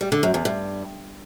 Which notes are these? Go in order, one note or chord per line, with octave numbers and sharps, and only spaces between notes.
G3
D3
F#2
E2
G2